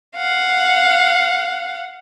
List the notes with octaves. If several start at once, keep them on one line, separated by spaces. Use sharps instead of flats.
F5 F#5